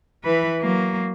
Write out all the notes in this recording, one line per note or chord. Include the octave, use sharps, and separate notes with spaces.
E3 B4
F#3 A#3